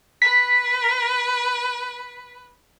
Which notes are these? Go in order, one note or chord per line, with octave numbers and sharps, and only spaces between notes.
B4 B6